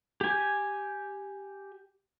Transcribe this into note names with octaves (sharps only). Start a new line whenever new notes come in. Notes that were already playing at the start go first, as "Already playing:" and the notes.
G4 G#5